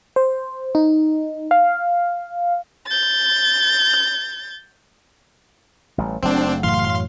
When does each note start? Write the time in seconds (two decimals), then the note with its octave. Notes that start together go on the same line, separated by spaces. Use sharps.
0.16 C5
0.75 D#4
1.51 F5
2.87 G6 A6
5.98 A1 G3
6.23 F#1 F#3 A3 C4 D4
6.63 F#2 A2 E3 F5 C6
6.87 F#3